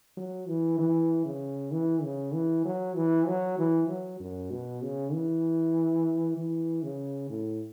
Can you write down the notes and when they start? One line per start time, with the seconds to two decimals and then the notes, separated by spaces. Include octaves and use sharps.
0.17 F#3
0.48 E3
0.78 E3
1.25 C#3
1.72 E3
2.03 C#3
2.34 E3
2.65 F#3
2.96 E3
3.27 F#3
3.58 E3
3.89 F#3
4.20 F#2
4.51 B2
4.82 C#3
5.13 E3
6.37 E3
6.83 C#3
7.30 A2